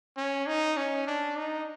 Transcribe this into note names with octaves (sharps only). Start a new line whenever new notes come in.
C#4
D#4
C#4
D4
D#4